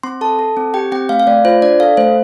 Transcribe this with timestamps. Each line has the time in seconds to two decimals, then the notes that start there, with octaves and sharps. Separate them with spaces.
0.03 C4 C6
0.21 A4 A5
0.39 A4
0.57 C4
0.74 G4 G5
0.92 C4 G5
1.09 A3 F5
1.20 F5
1.27 A3 D5
1.45 F4 C5
1.62 D4 D5
1.80 A4 F5
1.97 A3 C5